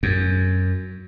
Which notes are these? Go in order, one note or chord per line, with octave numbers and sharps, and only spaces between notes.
F#2